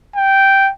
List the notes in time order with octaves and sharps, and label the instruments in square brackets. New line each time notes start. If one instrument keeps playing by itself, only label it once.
[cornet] G5